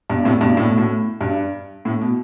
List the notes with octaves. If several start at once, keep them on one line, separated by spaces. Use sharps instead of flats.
G2 B2
A2 C3
G2 B2
A2
B2
A2
G2
A2
B2